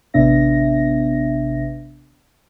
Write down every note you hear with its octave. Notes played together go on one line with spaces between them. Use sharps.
A1 C3 B3 D4 E5 A#6